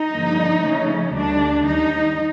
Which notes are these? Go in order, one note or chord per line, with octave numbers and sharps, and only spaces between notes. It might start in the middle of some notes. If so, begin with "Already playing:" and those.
Already playing: D#4
G2 D3 F3 A#3
C#3 F3 A3 C#4
D2 D3 G3 D4
D#2 D#3 G3 D#4